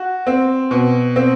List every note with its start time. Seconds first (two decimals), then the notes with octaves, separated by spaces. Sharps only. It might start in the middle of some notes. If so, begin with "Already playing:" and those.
Already playing: F#4
0.27 C4
0.71 B2
1.16 C4